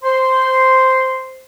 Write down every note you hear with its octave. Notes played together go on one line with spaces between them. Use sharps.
C5 C6